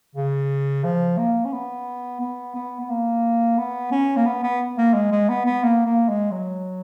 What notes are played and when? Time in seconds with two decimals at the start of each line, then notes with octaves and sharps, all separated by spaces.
0.15 C#3
0.84 F3
1.18 A#3
1.45 C#4
1.53 B3
2.21 B3
2.55 B3
2.80 B3
2.89 A#3
3.58 B3
3.91 C#4
4.16 A#3
4.26 B3
4.43 B3
4.78 A#3
4.94 G#3
5.12 G#3
5.29 B3
5.46 B3
5.63 A#3
5.86 A#3
6.09 G#3
6.31 F#3